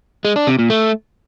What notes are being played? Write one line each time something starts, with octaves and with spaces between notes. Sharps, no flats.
G#3
D4
C3
A#2
A3